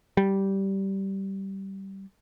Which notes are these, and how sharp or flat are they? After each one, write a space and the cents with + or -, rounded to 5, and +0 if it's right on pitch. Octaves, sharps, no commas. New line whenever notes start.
G3 -15